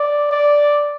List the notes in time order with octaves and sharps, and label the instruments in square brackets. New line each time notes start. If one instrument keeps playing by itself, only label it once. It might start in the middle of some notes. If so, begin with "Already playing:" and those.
Already playing: [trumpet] D5
D5